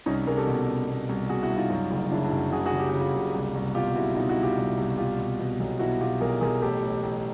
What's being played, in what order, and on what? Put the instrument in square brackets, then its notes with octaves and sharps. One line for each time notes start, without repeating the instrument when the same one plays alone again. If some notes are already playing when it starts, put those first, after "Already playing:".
[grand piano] C2 C#4 D#4
C2 G#4 A#4
G4 A4
B2
B2
B2
C2
B2 F#4 G#4
E4 F#4
C2
D#4 F4
F#2
F#1
C#3 D4 E4
D4 E4
F#2
C#3 F#4 G#4
F#4 G#4
C#3
G4
C#3 F#4
F4 G4
F#1
C2
C2
B2 F4 G4
C2 E4 F#4
B2 D#4 F4
E4 F#4
C2
F4 G4
C2
C2
B2 F4 G4
B2
B2
B1
B2 E4 F#4
B2 F4 G4
B1 G#4 A#4
B1 G#4 A#4
A1 G4 A4
A1
A1